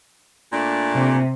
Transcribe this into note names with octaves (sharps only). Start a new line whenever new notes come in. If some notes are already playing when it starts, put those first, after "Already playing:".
A#2 A3 D4
C3